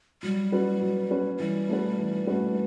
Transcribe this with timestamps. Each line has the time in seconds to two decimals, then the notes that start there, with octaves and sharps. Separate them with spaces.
0.23 F#3 G3
0.52 C#4 F#4 B4
0.81 F#3
1.11 C#4 F#4 B4
1.40 E3 G3
1.69 A3 C#4 F#4 B4
1.98 E3
2.27 A3 C#4 F#4 B4